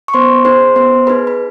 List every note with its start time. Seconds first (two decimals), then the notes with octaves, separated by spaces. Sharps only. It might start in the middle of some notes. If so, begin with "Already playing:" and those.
0.08 C#6
0.14 B3 C5 C6
0.45 D#4 G#4 C5 C6
0.76 B3 C5 C6
1.07 D#4 G#4 B4 B5
1.27 B5